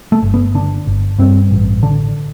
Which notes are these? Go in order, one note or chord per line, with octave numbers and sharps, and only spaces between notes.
A3
G1
B3
D3 D4
G1
G2 C4
A1
D3 D4